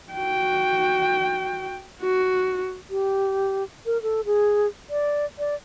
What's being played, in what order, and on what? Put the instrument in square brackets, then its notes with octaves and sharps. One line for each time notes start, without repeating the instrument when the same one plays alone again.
[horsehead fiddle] F#4 G5
F#4
[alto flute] G4
A#4
A4
G#4
D5
D5